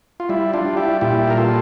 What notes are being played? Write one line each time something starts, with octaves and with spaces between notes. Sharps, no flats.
F4
G3 E4
D4 F4
G3
E4 G4
A#2 E4 G4
A#4
G3 F4 A4